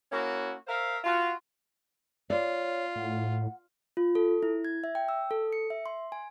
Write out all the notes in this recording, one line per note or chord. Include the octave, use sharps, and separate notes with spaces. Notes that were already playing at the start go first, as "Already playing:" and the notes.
A#3 C#4 E4 F#4
A#4 C5 E5 F5
F4 F#4
F4 C#5 D5
A2 F#5
F4
A4
E4
G#6
E5
G5
E6
A4
C#7
E5
C6
G#5